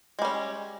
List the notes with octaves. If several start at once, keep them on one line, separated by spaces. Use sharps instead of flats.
G3 G#3 C#4